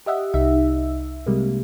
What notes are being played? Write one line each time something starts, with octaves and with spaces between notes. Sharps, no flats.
G4 D#5 E5 F#5
C2 D#4 E5
C3 G3 G#3 A#3